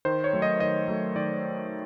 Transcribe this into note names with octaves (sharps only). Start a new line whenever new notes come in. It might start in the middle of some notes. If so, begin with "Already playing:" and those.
D#3 C5
C#5
F#3 A3
D#5
D#3 D#5
F#3 A3
D#3 D5